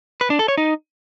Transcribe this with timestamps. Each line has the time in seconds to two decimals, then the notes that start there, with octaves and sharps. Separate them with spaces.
0.21 B4
0.30 D4
0.39 A4
0.48 C#5
0.57 D#4